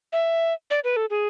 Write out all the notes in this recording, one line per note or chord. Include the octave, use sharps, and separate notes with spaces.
E5
D5
B4
A4
G#4